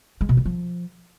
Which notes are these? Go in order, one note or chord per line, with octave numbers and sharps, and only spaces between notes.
G#3
B2
D#3
F3